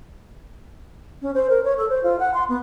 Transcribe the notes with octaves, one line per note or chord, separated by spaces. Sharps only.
C#4
C5
A#4
C#5
A4
C5
F4
F#5
C6
B3